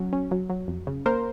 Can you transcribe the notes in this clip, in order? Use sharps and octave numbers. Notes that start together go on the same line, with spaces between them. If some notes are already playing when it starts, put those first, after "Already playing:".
Already playing: F#3 C#4
C#4
F#3
F#3
F2
C#3
A#3 A#4 C5